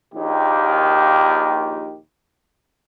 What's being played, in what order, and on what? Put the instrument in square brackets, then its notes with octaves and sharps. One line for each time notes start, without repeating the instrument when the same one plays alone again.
[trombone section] A#1 D#2 D#3 G4